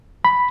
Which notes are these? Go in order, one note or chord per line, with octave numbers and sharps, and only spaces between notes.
B5